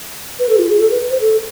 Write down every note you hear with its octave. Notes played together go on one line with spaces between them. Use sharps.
B4
A4
G#4
F4
G#4
A4
B4
C5
A4